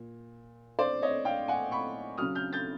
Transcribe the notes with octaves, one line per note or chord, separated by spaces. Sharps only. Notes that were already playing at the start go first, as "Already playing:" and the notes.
Already playing: A#2
C5 D5
C#5 D#5
F5 G5
F#5 G#5
B5 C#6
C#3 F#3 D#6 F6
F6 G6
G6 A6